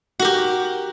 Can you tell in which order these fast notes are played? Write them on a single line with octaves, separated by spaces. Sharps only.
F#4 A#4 G4